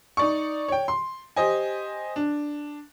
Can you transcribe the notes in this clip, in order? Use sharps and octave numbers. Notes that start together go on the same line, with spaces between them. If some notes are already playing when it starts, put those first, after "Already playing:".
D#4 D5 C#6
C#5 G5
C6
G4 C5 D#5 G#5
D4